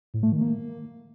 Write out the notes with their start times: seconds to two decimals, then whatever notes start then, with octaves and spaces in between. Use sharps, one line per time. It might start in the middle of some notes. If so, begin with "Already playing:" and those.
0.14 A2
0.23 A3
0.32 D#3
0.41 A#3